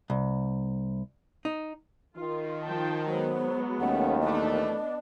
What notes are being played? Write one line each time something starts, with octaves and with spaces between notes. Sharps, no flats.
C2
D#4
D#3 F4
F3 G5 A5
F#3 G#3 B3 C5
D#2 A3 C#4 F#5
A#2 E3 A3 B3 D4 D#5